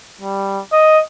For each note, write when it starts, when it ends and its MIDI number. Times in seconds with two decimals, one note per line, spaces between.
0.21 0.60 55
0.72 1.00 75